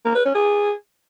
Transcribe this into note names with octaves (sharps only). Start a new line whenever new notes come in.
A#3
B4
C#4
G#4